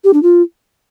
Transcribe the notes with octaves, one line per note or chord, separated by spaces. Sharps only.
G4
D4
F4